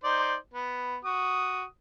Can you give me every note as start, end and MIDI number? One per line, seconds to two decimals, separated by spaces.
0.04 0.35 63
0.04 0.35 72
0.04 0.35 74
0.54 0.97 59
1.05 1.64 66
1.05 1.64 87